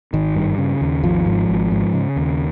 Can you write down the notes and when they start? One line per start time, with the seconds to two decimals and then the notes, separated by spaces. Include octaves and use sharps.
0.13 G#1 D#3
0.35 G2
0.58 C#3
0.81 D#2
1.03 G#1 F3
1.26 G#2
1.49 G#1
1.71 G#2
1.93 C#3
2.16 D#2